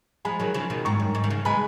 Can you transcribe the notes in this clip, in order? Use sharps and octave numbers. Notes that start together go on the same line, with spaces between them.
F3 G#3 G#5 B5
D#3 F#3
C#3 F3
B2 D#3
G#2 A#5 C#6
F#2
G#2
D#3
C#3
G#3 B3 G#5 B5